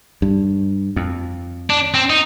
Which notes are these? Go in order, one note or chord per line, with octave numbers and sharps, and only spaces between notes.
G2
F2
D4
C4
D#4